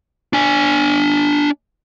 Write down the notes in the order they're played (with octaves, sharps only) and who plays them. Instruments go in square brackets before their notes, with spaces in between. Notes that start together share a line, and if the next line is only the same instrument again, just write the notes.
[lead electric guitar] D4 G#5